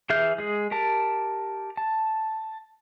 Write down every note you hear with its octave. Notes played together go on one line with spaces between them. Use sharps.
E3 G#4 E5 F6 G6
G#3 G#4
G4 A#4 A5
A5